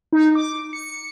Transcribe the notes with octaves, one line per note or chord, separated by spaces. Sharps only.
D#4
D6
C#7